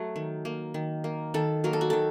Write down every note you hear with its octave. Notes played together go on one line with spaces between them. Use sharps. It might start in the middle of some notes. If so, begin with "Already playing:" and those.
Already playing: F#3 A3
D#3
A#3
D#3
A#3
D#3 A4
F#3 A#3 A#4
A4
F#4
D#3 A4